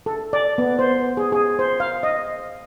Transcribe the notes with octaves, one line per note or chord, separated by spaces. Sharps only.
A4
D5
B3
C5
G#4
G#4
C5
F5
D#5